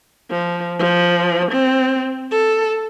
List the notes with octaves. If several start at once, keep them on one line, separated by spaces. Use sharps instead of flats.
F3
F3
C4
A4